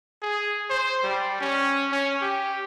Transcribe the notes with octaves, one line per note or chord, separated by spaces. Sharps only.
G#4
C5
G3
C#4
C#4
G4